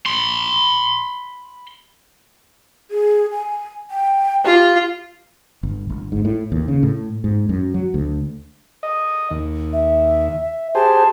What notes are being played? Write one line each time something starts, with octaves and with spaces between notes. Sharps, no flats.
B5 C6
G#4
G#5
G5
F4 G4
G1
G1
G#2
A2
D#2
C#3
A2
G#2
F#2
F#3
D2
D#5
D#2
E5
G4 G#4 C5 A5